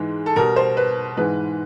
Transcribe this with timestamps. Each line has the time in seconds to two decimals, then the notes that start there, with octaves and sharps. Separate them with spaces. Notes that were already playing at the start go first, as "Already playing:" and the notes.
Already playing: G#2 E3 G#3
0.26 A4
0.36 B2 G3 A#4
0.56 C5
0.77 B4
1.17 G#2 E3 G#3 B4